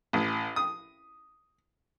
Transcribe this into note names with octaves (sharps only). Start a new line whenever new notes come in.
A1
D#6